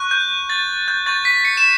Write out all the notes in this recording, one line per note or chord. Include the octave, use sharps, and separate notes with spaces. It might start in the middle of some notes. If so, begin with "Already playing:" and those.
Already playing: C#6 F#6
G6
A6
G6
C#6 G6 A6
B6
C#7
E7